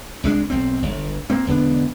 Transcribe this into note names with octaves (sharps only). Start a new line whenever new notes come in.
C2 G#3 C4 D4
B1 C4
G1
A#3 C4
E1 D3 B3 D4